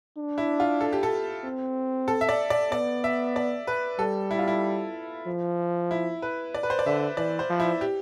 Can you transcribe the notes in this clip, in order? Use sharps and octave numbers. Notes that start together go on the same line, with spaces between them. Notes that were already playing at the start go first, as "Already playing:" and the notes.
D4
E4
F4
A4
G4
A4
C4
A4
E5
D5
D5
B3 D5
E5
D5
B4
G3 A4
E4
F4
E4
F3
E4
B4
D5
B4
C5
D5
D3 E5
E3 D5
C5
F3
E4
G4